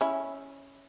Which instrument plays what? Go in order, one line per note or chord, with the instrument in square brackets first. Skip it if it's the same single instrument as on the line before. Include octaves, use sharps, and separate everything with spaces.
[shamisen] C#4 E4